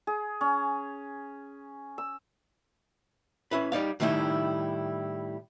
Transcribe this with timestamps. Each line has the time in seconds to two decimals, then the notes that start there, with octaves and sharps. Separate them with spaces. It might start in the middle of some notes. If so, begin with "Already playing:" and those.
0.07 G#4
0.41 C#4
1.98 E6
3.51 C#4 E4 B4
3.72 G3 D#4 D5 F5
4.00 A2 D#3 G3 D#4 E4